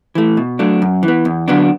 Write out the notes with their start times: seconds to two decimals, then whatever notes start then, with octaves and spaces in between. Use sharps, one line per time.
0.15 E3 A3
0.37 B2
0.59 F#3 A3 D4
0.82 F#2
1.03 E3
1.08 B3
1.25 E2
1.48 D3 F#3 B3 D4